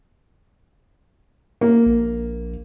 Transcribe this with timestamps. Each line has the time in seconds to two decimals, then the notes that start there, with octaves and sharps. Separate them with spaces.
1.61 A#3
1.86 A#1